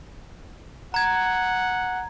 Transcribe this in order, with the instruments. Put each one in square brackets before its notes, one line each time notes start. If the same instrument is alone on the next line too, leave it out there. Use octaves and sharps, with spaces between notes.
[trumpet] F#5 [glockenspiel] A#5 G#6